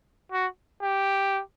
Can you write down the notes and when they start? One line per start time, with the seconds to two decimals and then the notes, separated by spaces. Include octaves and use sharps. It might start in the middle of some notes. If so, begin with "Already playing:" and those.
0.32 F#4
0.82 G4